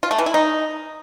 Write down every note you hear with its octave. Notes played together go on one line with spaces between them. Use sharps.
F4
A3
E3
E4
D#4